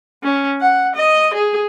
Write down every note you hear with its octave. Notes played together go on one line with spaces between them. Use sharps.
C#4
F#5
D#5
G#4